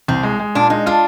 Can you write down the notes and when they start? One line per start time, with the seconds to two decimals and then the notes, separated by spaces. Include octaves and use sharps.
0.08 C2 C4
0.23 G#3
0.40 G#3
0.55 A#2 D4
0.70 G#3 D#4
0.86 D4 F4